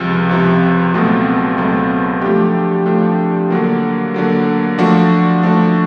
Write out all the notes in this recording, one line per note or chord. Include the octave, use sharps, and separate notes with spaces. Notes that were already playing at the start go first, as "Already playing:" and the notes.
Already playing: C#2 C3 F3
C#2 C3 F3
C#2 B2 F#3 A3 C4
C#2 B2 F#3 A3 C4
F3 A3 D4 G4
F3 A3 D4 G4
D3 F#3 A#3
D3 F#3 A#3
F3 A3 D4 F#4
F3 A3 D4 F#4